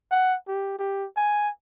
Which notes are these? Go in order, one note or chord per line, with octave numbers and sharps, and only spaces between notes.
F#5
G4
G4
G#5